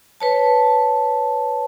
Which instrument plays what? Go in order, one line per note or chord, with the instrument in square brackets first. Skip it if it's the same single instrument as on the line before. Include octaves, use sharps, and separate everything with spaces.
[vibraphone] B4 C#5 A5